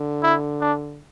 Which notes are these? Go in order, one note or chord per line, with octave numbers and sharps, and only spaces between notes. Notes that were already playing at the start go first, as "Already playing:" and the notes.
Already playing: D3
E4
D4